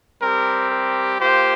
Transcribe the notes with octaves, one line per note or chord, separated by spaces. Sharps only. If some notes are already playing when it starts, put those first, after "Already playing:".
G3 C4 G4 A#4
A#4
A#3 F4 G4 C5